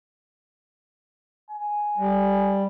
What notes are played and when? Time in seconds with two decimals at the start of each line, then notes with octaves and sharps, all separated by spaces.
1.51 G#5
1.98 G3